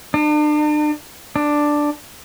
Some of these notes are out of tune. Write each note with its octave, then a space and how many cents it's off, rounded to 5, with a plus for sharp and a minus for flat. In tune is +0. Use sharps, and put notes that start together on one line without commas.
D4 +40
D4 +5